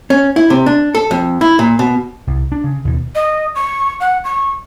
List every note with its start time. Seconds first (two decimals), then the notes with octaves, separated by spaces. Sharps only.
0.10 C#4
0.36 E4
0.50 C3
0.66 D4
0.95 A4
1.11 F2
1.41 E4
1.59 A#2
1.79 B2
2.27 C2
2.52 D4
2.64 C#3
2.85 D#2 B2
3.15 D#5
3.55 C#6
4.00 F#5
4.24 C#6